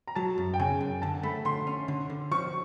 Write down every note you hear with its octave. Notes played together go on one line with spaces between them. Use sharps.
A#5
F#3 A5
F#2
G5
C#3 G#5
F#2
D3 A5
A3 B5
D3 C6
C#4
D3
D3
F3 C#6